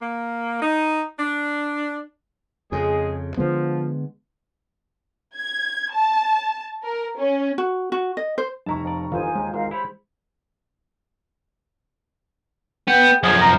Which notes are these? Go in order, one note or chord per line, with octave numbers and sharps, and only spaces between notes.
A#3
D#4
D4
F2 C#3 G#3 G#4
D3 F3 G#3 B3
G#6
A5
A#4
C#4
F#4
F#4
D#5
C5
F1 E4 A5 A#5 C#6
F2 D5
G1 G#2 E3 D#4 F4 C5 G#5
D#2 G#3
G#1 G#2 A#4 F5
E4 G4 C5 C#5 B5
B3 G5
F#2 F3 G#4
A#5